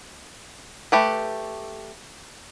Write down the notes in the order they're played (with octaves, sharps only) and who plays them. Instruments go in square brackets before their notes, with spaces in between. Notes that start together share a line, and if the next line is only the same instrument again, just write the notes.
[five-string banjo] A3 G4 B4